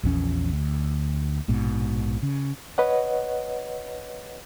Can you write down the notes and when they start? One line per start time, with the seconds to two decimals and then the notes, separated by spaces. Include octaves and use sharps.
0.03 A#1 E2 C#4
0.52 D2
1.48 A#1 G#2 B2
2.23 C#3
2.78 B4 C#5 D#5 F#5